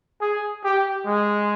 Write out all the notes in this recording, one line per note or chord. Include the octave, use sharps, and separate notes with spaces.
G#4
G4
G#3